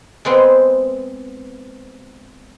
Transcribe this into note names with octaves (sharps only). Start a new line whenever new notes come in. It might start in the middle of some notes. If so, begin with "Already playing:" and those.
G#3 B3 C4 B4